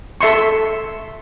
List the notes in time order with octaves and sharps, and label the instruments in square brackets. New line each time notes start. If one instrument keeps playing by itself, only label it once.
[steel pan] A4 E5 C6 C#6